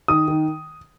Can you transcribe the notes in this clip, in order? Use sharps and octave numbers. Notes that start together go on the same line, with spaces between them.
D#3 D#6
D#3